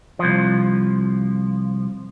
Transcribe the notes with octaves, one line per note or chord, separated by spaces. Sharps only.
C2 F3